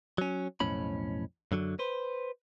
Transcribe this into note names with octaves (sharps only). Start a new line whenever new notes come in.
F#3 C#4
B1 F2 A2 C#4 B5
F#2 D3 F#3
B4 C5